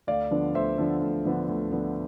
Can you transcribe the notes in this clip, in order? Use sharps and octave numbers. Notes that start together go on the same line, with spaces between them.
D2 D5 F5
D3 F3 B3 D4
D2 C5 E5
D3 F3 B3 D4
D2
D3 F3 B3 D4
D2
D3 F3 B3 D4